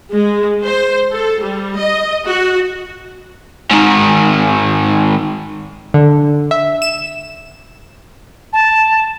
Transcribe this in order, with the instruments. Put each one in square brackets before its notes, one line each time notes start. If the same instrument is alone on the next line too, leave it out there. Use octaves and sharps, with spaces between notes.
[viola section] G#3
C5
A4
G3
D#5
F#4
[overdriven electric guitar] G#2 D#3
[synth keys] D3
E5
E7
[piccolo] A5